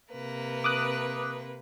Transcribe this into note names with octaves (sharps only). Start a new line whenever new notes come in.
C3 A#3 B4
D6 D#6 F#6